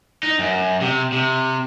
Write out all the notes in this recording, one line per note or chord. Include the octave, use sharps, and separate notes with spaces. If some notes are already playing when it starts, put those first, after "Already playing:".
D#4
F#2
C3
C3